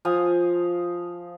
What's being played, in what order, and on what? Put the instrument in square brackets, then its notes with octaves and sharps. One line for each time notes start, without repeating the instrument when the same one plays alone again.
[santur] F3 F5 G#5 D#6